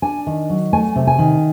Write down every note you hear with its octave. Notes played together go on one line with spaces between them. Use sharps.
D4 G#5
D#3
F#3
A3 G#5
C3
G#5
D#3